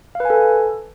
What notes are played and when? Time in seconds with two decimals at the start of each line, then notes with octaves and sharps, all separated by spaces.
0.15 F5
0.20 B4
0.25 G#5
0.30 A4